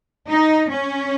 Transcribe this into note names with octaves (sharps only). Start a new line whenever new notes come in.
D#4
C#4